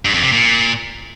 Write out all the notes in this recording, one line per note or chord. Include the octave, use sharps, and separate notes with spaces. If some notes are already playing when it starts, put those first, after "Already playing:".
G2
F2
C3
A#2